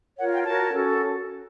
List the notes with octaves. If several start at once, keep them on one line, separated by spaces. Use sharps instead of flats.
F4 A#4 C#5 F#5
G5
F#4 A#4 C#5 A5
C#4 F#4 A4